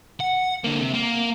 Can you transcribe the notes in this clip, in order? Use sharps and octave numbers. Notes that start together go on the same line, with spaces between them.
F#5
D3 A#3
C3
A#3